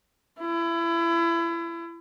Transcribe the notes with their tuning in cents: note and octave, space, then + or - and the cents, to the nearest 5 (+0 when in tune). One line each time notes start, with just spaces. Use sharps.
E4 +30